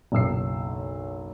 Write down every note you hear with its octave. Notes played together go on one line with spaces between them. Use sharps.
F#1 B1 E6 C7